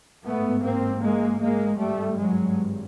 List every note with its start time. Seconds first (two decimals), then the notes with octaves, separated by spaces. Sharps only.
0.24 A1 G#2 A3 B3
0.63 A#3 C4
1.02 G#3 A#3
1.41 G#3 A#3
1.80 G#1 G2 G3 A3
2.19 F#3 G#3